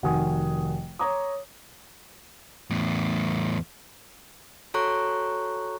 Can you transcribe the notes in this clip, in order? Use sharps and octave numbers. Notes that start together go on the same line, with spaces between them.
F1 D#3 F#4 F#5 G#5 D#6
C#5 A#5 D6 D#6
E2 A2
F#4 A4 C#5 A#5 C#6 F#6